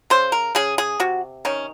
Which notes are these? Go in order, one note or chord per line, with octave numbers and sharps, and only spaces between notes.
C#3 C5
A#4
C#3 G#4
G#4
C3 F#4
D#3 C#4